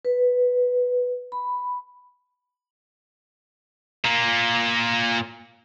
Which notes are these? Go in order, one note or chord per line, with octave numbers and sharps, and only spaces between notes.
B4
B5
A#2 A#3